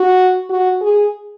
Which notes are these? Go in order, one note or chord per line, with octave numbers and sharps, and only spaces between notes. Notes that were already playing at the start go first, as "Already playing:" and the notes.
Already playing: F#4
F#4
G#4